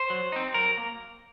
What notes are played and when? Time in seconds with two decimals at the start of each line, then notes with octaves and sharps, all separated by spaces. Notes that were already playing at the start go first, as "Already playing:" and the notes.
Already playing: C5
0.10 F#3
0.32 C4 D#4
0.54 F#3 A#4
0.78 A#3